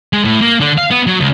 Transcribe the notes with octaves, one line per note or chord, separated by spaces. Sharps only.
G#3
A2
A#3
D3
F5
B3
F#3
C#2